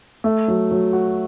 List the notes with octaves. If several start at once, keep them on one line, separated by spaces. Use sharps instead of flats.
A3
F#3
F#3
F#4